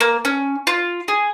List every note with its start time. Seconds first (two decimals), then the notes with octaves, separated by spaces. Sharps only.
0.01 A#3
0.25 C#4
0.67 F4
1.08 G#4